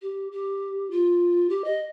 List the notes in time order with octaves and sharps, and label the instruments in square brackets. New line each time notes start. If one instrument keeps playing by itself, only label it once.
[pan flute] G4
G4
F4
G4
D#5